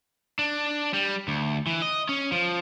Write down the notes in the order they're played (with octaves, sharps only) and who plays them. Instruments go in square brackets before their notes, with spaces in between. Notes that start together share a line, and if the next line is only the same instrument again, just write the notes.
[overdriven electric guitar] D4
G3
D2
E3
D#5
C#4
F3